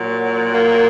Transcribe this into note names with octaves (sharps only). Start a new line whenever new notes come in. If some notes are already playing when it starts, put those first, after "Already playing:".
Already playing: A#2 F#3
A#3